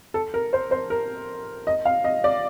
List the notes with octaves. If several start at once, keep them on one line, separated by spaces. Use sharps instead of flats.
A4
A#4
C5
C5
A#4
D#5
F5
D#5
D5